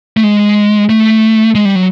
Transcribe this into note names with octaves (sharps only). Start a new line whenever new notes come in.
A3
G#3
A3
G#3
G3
F#3